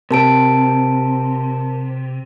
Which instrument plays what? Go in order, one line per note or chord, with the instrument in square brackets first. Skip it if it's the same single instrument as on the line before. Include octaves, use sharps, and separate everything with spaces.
[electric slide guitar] C3 [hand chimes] A#4 A5 D7